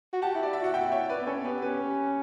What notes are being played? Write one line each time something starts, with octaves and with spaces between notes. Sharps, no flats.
F#4
G4 F#5 A5
E4
D5
E4
E5
F#4 F#5
E4 E5 G5
C#5 E5
B4 D5
B3
C#4 A4 C#5
B3 G4 B4
C#4 G4 B4